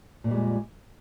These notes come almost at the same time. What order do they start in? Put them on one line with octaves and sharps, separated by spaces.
A#2 F2 G3 G#3